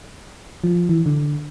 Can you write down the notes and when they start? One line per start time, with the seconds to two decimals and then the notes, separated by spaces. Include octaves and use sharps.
0.64 F3
0.89 E3
1.06 D3